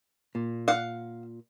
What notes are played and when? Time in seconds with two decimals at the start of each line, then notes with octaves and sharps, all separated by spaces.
0.35 A#2
0.68 F5 F#5